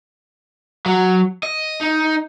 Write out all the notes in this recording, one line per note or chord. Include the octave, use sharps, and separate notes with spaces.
F#3
D#5
D#4